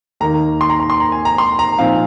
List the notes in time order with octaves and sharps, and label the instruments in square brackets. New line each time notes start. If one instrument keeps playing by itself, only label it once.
[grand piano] D#2 D#3 A#3 A#5
C6
A#5
A#5
C6
A#5
G#5
A#5
C6
A#5
A#2 F3 C4 D#4 F5